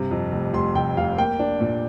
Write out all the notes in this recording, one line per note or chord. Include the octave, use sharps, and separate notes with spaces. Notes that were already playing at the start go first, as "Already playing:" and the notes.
Already playing: G2 C3
F2
F1
F1 C6
F1 G5
F1 F5
A#3 G5
D4
A#2